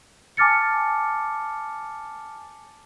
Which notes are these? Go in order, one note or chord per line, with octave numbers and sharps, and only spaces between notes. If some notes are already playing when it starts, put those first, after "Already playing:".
G#5 A5 D6 F6 A6 C#7